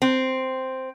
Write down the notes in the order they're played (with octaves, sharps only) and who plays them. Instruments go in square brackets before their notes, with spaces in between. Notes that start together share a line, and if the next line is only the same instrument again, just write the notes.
[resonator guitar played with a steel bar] C4